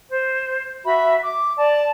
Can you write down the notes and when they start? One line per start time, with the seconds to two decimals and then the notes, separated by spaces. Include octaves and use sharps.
0.11 C5
0.84 F#4 E5 B5
1.22 D6
1.57 D5 A5